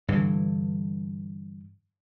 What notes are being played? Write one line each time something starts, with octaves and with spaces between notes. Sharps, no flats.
G2 D3 E3